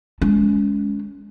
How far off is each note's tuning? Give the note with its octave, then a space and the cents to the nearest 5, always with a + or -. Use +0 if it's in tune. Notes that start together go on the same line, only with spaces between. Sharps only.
G#3 +0 C#4 +25